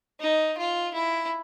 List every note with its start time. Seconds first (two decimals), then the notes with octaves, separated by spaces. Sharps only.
0.21 D#4
0.58 F4
0.94 E4